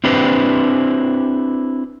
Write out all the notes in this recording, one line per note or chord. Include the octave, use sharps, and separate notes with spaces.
C4 D4 E4 G4 B4 C5